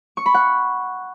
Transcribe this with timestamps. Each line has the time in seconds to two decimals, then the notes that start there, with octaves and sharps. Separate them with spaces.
0.17 C#6
0.26 B5
0.34 F#5